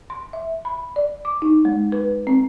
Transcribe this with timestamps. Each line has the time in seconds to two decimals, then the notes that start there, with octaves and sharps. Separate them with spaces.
0.10 C6
0.33 E5
0.65 B5
0.96 D5
1.25 D6
1.42 D#4
1.65 G#3
1.92 B4
2.27 C4